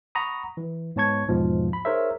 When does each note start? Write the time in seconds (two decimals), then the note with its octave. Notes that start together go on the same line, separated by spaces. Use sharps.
0.15 F#5 A#5 B5 C#6 D#6
0.57 E3
0.96 G#2 B3 C#5 A5 C#6 G#6
1.29 E2 G#2 B2 F3
1.73 B5
1.85 D#4 G#4 A#4 C5 C#5 E5